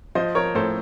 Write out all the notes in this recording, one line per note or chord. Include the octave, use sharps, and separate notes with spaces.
F3 C5 D#5
F3 A#4 C#5
A2 A4 C5